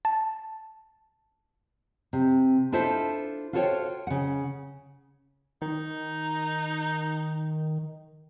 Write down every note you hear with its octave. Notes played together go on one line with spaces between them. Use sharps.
A5
C3
D4 E4 F4 A4 C5 E5
F4 F#4 A4 C5 C#5 G5
C#3 F#5
D#3 D#4